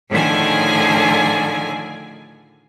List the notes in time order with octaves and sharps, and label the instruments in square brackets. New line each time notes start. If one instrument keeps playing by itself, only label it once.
[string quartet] A2 D3 D#3 F3 G#4 G#5